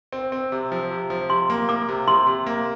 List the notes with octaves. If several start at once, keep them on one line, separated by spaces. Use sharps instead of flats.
C4
C4
C3
F3
C3
F3
C3 C6
A#3
A#3 D6
C3
C3 C6
C3
A#3